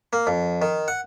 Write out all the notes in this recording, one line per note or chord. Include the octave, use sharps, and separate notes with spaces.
A#3
F2
D#3
F#5